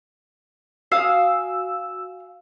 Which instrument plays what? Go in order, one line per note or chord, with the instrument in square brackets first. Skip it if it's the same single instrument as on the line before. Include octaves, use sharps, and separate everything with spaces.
[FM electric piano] F#4 E6 [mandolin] F5 G#5 D#6